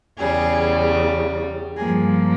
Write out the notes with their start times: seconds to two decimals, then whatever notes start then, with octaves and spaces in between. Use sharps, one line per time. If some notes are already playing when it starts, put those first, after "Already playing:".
0.19 E2 C#3 G3 G#4
1.77 G2 F3 A#3 G#4